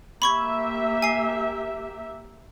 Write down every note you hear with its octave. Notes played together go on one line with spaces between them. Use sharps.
A#3 G4 E5 B5 C#6 G#6
G#5 C7